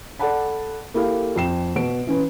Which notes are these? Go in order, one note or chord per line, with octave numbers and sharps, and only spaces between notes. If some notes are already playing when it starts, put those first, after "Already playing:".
A4 D5 F#5 A5 B5
A#3 E4 G4 A4 F5
F2 G5 C7 E7
B2 D7
E3 C#4 B4